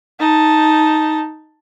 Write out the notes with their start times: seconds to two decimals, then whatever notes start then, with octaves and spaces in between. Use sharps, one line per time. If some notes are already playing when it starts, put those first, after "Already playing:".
0.20 D#4 A5